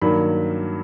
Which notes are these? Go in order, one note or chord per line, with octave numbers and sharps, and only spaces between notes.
G2 D#3 F#3 A#3 B5